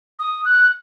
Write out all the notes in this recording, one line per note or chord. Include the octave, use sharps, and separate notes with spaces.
D#6
F#6